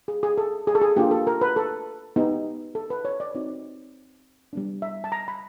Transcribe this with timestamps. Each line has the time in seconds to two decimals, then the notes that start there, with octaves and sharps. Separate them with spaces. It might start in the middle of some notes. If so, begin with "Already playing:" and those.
0.08 G#4
0.23 G#4
0.38 A4
0.67 G#4
0.75 A4
0.82 G#4
0.96 A#3 D4 F4 G4
1.11 A4
1.27 A#4
1.41 B4
1.56 A4
2.16 B3 D#4 G4
2.75 A4
2.90 B4
3.05 C#5
3.20 D5
3.35 C4 D#4 F#4
4.53 G3 B3 D4
4.82 E5
5.04 A5
5.12 A#5
5.28 B5